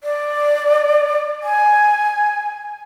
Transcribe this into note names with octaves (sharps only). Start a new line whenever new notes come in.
D5
G#5